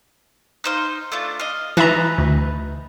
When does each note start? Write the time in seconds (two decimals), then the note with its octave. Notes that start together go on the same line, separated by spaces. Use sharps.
0.64 D#4 C5 F5
1.12 A3 D4 F4
1.40 D#5 F5
1.77 E3 D#4 B4 E5 A5 A#5
2.18 D2